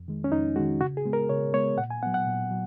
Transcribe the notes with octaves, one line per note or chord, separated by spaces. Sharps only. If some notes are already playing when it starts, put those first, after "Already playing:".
Already playing: F2
D#3 G#3
C#4
F2 D#4
D#3 G#3 F#4
C#3 F#4
G#4
G#3 B3
A#4
C#3 C#5
G#3 B3 C#5
A#2 F#5
G#5
F#3 B3 F#5
F#5
A#2
F#3